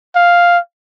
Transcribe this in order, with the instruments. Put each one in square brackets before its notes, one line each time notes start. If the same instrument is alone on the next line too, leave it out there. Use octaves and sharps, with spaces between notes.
[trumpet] F5